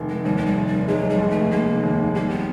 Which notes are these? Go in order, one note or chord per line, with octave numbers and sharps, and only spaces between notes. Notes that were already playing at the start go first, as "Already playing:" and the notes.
Already playing: F1 D#3
G#3
D#2 G3
G#3
G3
F1
G3
F#3 G#3
G3
F1
A3
F1 A#3
D#2
G3 A#3
B3